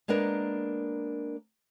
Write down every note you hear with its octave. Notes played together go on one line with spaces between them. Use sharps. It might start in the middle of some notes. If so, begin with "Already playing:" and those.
G#3 A#3 B3 D4 A#4